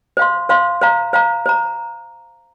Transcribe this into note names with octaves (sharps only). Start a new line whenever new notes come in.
C5 F5 C6
C5 F5 C6
C5 F5 A#5
C5 F5 A#5
C5 A#5